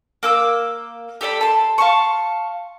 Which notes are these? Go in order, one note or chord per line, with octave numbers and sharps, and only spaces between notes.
A#3 D6 E6
G4 A4 D5 B5
A5 C6
F5 A5 C6 C#6